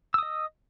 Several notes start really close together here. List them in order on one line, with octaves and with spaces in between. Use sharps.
E6 D#6 D#5